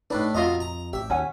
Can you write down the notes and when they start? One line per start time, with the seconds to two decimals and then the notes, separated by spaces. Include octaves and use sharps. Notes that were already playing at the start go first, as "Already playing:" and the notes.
0.10 A2 D4 D#4 B4
0.35 F2 B2 F4 D#5 E5 A#5 C6
0.60 A#5
0.93 A1 G4 E5
1.10 D#2 C#4 F#5 G#5